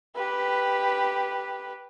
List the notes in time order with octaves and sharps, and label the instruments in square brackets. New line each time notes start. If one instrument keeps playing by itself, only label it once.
[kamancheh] G4 B4